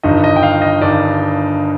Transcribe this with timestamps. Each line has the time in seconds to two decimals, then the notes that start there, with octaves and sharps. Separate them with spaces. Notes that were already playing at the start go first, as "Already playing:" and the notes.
0.03 G1 G2 D#3 D#5
0.24 D#5
0.36 G5
0.43 F5
0.62 D#5
0.82 G1 G2 D#3 D5